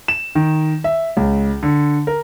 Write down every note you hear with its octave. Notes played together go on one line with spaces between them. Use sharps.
E7
D#3
E5
C#2
D3
A#4